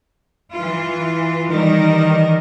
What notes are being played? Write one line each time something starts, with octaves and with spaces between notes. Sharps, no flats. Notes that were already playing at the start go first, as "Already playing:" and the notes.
E3 F4
D#3 E3 G3 A#4